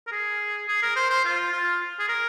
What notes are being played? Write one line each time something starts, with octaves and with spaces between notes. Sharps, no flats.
A#4
G#4
G#4
A#4
C5
C5
F4
F4
G#4
A#4